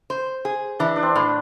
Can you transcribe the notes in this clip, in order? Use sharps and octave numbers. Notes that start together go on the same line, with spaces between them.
C5
G#4
E3 D4
D4
C4
A2